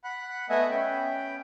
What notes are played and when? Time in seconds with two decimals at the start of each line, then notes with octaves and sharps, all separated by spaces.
0.04 F#5 B5 F#6
0.50 A3 B3 D#5 E5 F#5 G#5
0.71 C#4 G5 B5